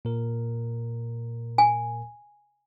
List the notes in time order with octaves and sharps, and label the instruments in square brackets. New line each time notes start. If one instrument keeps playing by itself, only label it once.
[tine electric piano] A#2 A#4
[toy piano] G#5